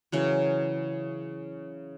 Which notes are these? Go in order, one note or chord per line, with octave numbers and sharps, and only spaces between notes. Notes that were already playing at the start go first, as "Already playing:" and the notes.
C#3 E3 F#3